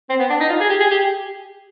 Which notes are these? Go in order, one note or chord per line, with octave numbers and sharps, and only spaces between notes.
C4
B3
D4
D#4
F4
G#4
G4
G#4
G4